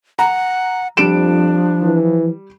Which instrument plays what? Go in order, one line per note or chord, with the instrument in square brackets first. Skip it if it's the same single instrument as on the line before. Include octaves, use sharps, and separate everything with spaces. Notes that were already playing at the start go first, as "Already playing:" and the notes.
[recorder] F#5 [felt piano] A#5
[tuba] F2 [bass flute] F3 [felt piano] G3 D7 E7 [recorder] D4
[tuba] E3